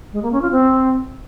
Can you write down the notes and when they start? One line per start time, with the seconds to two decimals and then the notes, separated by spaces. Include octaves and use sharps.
0.13 G#3
0.22 A#3
0.32 C#4
0.42 F4
0.51 C4